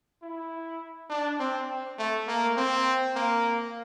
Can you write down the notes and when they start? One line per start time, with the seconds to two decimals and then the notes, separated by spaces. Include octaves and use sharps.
0.22 E4
1.10 D4
1.40 C4
1.98 A3
2.28 A#3
2.57 C4
3.16 A#3